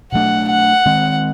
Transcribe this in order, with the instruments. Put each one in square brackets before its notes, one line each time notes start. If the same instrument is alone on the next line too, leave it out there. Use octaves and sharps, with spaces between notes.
[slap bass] B2 F#3 A3 D4 [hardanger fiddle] F#5
[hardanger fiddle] F#5
[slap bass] D#3 G#3 C4